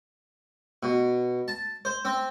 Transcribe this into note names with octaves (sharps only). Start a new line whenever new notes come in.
B2
A5
C5
C4